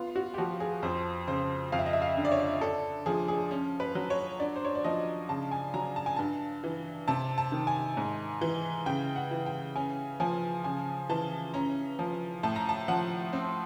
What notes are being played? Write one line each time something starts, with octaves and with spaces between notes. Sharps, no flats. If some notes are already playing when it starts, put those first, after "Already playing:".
Already playing: B3 F4
F#4
G4
F3 F#4
G#4
F2 C5
C#3 C5
F2 F5
E5
D#5
E5
F5
D3
D5
C#5
D4 A4
F3 G#4
G#4
C#4
B4
F#3
C#5
D4 D5
C5
C#5
D5
F3 D#5
C#3 A5
G#5
F#3 A#5
A5
G#5
G2 A5
E3
C3 A5
A5
D#3
G#5
G#2
E3
C#3 G5
F#5
E3
G5
C#4 G#5
F3 G#5
C#3 G#5
E3 A5
C#4 A#5
F3
A2 A5
A#5
A5
F3 F#5
C4